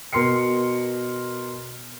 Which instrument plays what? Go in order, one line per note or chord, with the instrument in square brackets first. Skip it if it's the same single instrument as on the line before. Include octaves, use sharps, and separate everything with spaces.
[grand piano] B2 A#4 C6 C7 C#7